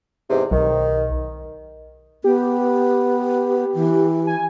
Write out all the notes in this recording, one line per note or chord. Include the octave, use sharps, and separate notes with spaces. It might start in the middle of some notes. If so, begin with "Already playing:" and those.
E2 G#2 C3
B1 D#3
B3 G4
E3
G#5